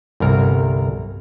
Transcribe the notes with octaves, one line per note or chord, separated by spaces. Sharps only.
G1 C2 A#4